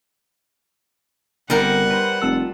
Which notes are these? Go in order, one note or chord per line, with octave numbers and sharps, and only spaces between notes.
G1 D3 G3 C4 A#4 F#5
B4 C5
F1 F4 A5 E6